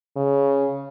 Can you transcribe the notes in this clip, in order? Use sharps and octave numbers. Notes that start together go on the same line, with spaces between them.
C#3